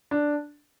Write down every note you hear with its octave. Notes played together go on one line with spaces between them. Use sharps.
D4